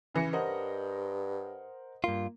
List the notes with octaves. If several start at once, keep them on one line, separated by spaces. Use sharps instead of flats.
C#3 E3 B5 A#6 C#7
G2 A#4 C5 D#5 F#5
G2 A#3 F4